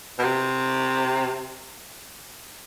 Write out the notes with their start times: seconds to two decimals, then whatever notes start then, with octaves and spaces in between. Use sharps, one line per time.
0.19 B2
0.24 C3